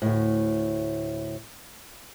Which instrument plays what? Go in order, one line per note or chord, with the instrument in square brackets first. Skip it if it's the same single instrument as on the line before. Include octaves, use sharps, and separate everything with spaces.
[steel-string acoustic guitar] D2 A2